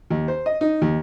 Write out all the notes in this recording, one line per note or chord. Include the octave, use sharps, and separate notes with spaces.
D#2
C5
D#5
D#4
D#2